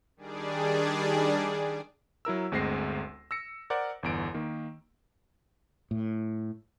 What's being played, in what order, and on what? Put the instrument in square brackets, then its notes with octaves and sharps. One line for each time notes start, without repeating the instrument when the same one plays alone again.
[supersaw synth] D#3 G3 D4 G#4 D5
[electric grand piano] F#3 E4 A#4 E6
G1 D2 G#3 C4 A#6 C7
E6 A#6 C#7
A#4 C5 D5 F#5
G1 E2 D7
D#3 A#3
[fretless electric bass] A2